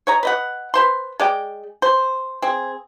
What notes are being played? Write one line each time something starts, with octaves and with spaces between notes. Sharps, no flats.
C#5 D#5 A#5
B4 D#5 F#5
B4 C5 C6
G#3 D5 G5
C5
C4 G#4